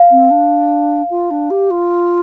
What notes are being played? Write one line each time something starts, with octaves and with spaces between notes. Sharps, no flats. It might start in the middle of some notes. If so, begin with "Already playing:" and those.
Already playing: F5
C4
D4
F4
D4
G4
F4